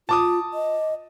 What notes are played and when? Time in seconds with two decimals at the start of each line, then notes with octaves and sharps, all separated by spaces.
0.09 F4 A5 D6 D#6
0.54 D#5